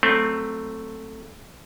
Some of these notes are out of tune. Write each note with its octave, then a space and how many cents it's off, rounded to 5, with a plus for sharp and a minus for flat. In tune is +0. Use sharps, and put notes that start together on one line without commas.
F#3 +5 A3 +10 C4 +0